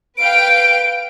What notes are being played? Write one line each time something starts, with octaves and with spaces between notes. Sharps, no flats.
B4 F5 G5 D7